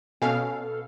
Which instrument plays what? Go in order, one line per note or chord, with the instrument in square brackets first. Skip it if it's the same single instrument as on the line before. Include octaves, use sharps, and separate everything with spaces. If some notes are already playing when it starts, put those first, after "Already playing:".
[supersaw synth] B2 F5 [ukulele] C#4 G#5 [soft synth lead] A4